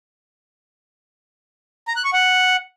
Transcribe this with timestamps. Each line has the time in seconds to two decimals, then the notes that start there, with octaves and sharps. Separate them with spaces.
1.88 A#5
1.96 F#6
2.04 C#6
2.13 F#5